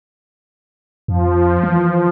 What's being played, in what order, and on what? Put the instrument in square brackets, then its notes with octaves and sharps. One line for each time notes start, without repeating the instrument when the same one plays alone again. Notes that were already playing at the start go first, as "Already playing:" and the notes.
[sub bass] F2 [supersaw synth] F3
[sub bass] E3